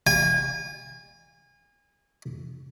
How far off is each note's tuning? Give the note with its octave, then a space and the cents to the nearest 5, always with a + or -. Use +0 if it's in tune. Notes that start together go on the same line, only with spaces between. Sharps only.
G#5 -30